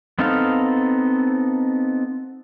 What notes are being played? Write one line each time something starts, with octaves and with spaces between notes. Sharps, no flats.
B3 C4 D#4 A4 F5